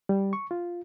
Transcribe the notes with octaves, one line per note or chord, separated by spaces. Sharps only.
G3
C#6
F4